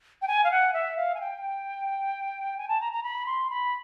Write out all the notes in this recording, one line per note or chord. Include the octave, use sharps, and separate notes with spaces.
G5
G#5
F5
F#5
E5
F5
G#5
G5
G#5
A5
A#5
A#5
B5
C6
B5